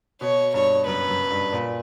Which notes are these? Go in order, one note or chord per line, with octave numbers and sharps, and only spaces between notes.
B2 C#5
G2 C#5
F#2 B4
F#2
G2
A#2